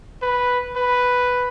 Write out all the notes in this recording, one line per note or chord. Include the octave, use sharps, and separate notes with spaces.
B4
B4